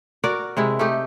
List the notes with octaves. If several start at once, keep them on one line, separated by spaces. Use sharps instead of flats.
F#4 A#4 D5
C3 G#3 E4
A3 D#4 G4